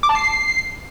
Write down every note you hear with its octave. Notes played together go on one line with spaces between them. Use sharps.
D6
A5
C7